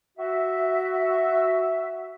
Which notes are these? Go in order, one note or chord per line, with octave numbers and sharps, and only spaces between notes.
F#4 E5